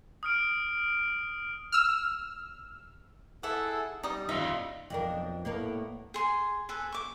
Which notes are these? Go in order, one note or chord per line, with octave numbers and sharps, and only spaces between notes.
D#6 F6 D7
E6 F6
E4 G#4 A4 E5 F#5
G3 D#4 D#6
D#4 F4 E5
B1 F2 D4 A#4 D#5 G5
A2 A#3 B3 A#4
G#4 C6
G#4 A4 B4
C#6 D6